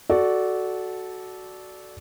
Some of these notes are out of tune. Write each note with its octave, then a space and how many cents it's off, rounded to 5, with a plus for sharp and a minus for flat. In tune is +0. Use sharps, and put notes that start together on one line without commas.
F#4 +5 A4 -15 D5 +0